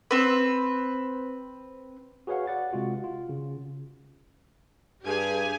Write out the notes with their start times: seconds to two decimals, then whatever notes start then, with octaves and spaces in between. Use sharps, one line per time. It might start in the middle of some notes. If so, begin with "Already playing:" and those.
0.11 C4 B4
2.27 F#4 G#4 B4 C#5 F5 F#5
2.47 D5 F#5 A6
2.73 C3 G#3 F4 F#4
3.04 F4
3.29 C#3
5.05 G2 G4 G#4 G#5